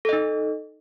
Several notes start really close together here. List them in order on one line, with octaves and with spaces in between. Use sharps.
A4 D#5 D#4